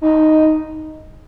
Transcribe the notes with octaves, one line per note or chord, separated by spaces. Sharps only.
D#4